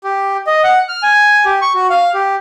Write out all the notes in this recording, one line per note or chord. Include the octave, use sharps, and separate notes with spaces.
G4
D#5
F#5
F6
G#5
G4
C#6
F#4
F5
G4